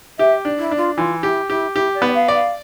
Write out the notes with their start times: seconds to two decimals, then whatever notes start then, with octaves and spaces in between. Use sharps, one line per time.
0.19 G4 E5
0.45 D4
0.59 E4
0.71 D4
0.77 F4
0.97 E3 F4
1.23 E4 G4
1.49 E4 G4
1.75 E4 G4
1.95 D5
2.02 B3
2.14 F5
2.28 D5
2.34 F5